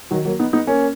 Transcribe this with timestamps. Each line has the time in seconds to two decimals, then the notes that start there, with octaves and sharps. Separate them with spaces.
0.11 D#3 F#3
0.25 F#3 A#3
0.39 B3 D#4
0.53 B3 D#4
0.67 A#3 C#4